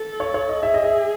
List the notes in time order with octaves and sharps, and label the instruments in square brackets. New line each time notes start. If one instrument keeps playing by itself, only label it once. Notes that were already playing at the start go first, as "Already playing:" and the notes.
Already playing: [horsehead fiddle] A4
[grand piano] C#5
C#5
D#5
[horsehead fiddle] G#4 [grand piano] E5
[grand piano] D#5
E5